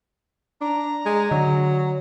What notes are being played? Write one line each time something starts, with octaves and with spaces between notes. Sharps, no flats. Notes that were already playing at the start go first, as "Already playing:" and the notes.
D4 A#5
G#3
D3 F#3